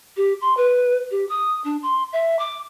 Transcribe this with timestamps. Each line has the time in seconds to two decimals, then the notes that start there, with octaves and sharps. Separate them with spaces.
0.17 G4
0.41 C6
0.57 B4
1.11 G4
1.29 D#6
1.64 D4
1.83 C6
2.13 E5
2.39 D6